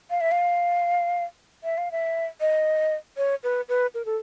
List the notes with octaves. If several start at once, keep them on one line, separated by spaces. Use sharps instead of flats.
F5
E5
F5
E5
F5
E5
D#5
C#5
B4
B4
A#4
A4